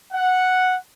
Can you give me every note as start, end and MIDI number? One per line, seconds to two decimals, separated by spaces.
0.13 0.77 78